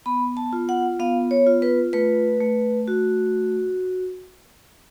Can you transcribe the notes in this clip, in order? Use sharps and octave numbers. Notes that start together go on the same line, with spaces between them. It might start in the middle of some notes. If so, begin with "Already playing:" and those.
B3 B5
A5
F4
F#5
B3 F5
C#5
F4
B4
A3 B4
A3
F#4